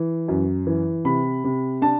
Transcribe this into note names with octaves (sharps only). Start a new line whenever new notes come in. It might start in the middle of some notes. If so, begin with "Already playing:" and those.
Already playing: E3
F#2
E3
C3 B5
C3
D4 A5